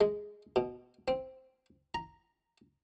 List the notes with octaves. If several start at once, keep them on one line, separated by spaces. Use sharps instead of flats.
G#3
B2
C4
A#5